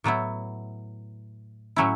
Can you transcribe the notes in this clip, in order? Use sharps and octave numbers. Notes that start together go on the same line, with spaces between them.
A2 F#3 B3 E4
A2 F#3 C#4 E4